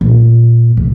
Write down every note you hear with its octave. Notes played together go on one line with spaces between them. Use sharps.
A#2
C3